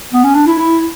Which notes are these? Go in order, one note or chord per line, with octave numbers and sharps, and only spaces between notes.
B3
C#4
D4
E4
E4